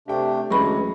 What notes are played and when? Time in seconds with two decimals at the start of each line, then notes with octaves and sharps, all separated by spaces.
0.08 C3 A3 D4 G4 G5
0.50 D2 E3 F#3 G#3 C#4 B5 C#6